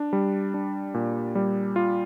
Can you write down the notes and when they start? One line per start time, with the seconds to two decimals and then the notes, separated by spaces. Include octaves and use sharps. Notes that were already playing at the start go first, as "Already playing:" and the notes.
Already playing: D4
0.13 G3
0.54 D4
0.94 A#2
1.35 G3
1.76 F4